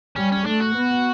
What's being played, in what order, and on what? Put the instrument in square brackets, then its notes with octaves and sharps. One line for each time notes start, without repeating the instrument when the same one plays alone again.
[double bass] G3 [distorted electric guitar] C#4
[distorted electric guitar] C#4
[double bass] A3 [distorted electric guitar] D4
[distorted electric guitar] F#4
[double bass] B3